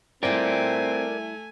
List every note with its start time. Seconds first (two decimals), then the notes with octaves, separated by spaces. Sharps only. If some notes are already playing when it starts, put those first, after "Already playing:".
0.23 G3 A3 C4 E4 A#4 D5 G5 G#5